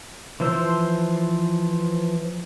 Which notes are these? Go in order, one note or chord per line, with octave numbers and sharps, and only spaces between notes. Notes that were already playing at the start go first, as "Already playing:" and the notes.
E3 F3 C5 E6